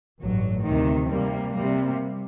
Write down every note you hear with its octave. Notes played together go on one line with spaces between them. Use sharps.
A1 G2 F#3
D2 C3 D#3
C3 G3 A#3
C3 G3 A#3